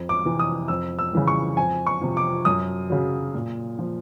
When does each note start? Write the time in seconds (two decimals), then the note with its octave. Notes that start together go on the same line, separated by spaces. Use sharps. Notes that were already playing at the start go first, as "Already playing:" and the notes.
Already playing: F2
0.09 D6
0.25 C3 E3
0.39 D#6
0.68 F2 E6
0.99 E6
1.13 C#3 E3 G3
1.28 C#6
1.57 F2 G#5
1.87 C#6
2.02 C3 F3
2.17 D6
2.45 F#2 D#6
2.90 C#3 F#3
3.34 A#2
3.79 F3